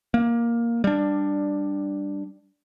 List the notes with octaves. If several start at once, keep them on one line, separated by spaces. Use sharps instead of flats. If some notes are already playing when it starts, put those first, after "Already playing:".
A#3
G3 D4